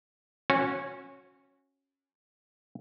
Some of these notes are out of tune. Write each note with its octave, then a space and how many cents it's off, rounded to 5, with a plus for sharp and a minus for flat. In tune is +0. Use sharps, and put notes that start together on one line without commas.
C#4 -10 F#4 -15 C#5 -35